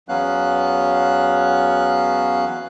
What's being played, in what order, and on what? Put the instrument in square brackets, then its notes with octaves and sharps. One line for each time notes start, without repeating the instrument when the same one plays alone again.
[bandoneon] E2 F#3 B3 C#4 F5 F#6